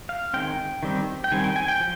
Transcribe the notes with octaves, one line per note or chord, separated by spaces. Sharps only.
F5
D#3 G#3 C4 G5
D#3 G3 C4
G5
D#3 G3 C4 G#5
G5
G#5
G5
F3